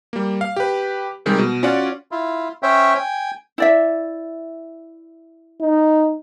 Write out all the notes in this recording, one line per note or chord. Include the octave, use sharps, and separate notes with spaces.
G3 A#3
F5
G4 B4
C3 D#3 G3 G#3
B2
C#4 F4 F#4 D5 F#5
E4 F4
C#4 C5 C#5 E5 G5
G5 G#5
E4 D5 E5
D#4